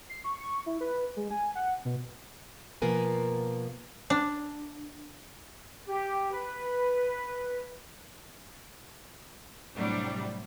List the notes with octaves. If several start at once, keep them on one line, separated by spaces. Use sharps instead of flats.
C7
C#6
C#6
E4
B4
G#3
G#5
F#5
B2
B2 F3 A#3 A#4 B4 G#5
D4
G4
B4
A2 C3 F#3 G3 D4 F#4